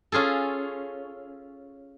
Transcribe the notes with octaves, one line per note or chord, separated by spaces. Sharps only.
C#4 F4 G#4 A4